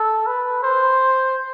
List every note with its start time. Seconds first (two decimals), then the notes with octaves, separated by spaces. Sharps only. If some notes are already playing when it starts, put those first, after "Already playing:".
Already playing: A4
0.27 B4
0.63 C5